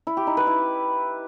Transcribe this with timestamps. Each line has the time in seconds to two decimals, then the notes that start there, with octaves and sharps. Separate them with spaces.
0.07 E4
0.17 G4
0.27 D#4
0.37 B4
0.47 E4